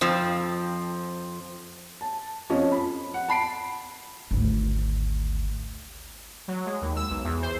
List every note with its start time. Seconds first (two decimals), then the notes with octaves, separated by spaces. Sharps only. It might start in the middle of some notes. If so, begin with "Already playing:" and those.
0.01 F2 F3 C4
2.01 A5
2.50 F2 F3 C#4 D#5
2.72 B5
3.14 F#5
3.28 A5 B5 C7 D7
4.31 G#1 D2
6.48 F#3
6.66 G#3
6.82 D#2
6.96 E6
7.10 B1
7.24 E2
7.42 C5